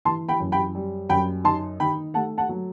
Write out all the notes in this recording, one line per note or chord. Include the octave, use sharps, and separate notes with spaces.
E3 A5 C6
G5 B5
F#2
G5 B5
G3
F#2 G5 B5
D#4 A5 C6
D#3 G5 B5
A3 F#5 A5
F#5 A5
F#3